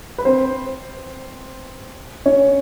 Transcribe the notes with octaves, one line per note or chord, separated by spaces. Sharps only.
B4
C4 C5
C#4 C#5